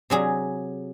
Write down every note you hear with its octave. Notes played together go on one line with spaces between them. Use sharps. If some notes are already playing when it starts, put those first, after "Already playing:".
C3 F#3 G#4